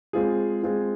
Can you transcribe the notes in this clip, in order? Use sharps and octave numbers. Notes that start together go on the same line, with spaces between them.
G#3 C4 F4 G#4
G#3 C4 F4 G#4